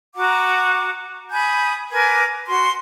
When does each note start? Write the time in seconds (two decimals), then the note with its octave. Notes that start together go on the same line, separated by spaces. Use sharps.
0.15 F#4 F#5 A#5 D6
1.31 G#5 B5 D#6 G6
1.91 A#4 B4 G#5 D6
2.46 F#4 C6